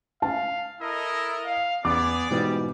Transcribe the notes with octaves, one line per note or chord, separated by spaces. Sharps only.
F5 A5
E4 A4 A#4 D#5
F5
E2 B3 G#4 D5 D6
G#2 B2 E3 G3